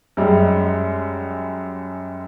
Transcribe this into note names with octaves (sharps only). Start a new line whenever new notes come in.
F#2 G3 G#3